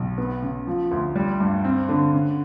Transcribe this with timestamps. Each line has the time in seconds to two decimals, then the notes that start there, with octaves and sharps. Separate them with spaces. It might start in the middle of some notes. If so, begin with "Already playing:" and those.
Already playing: B1
0.18 B3
0.42 C#3
0.67 F3
0.91 D2
1.16 G3
1.40 G2
1.65 C4
1.89 D3
2.13 C#3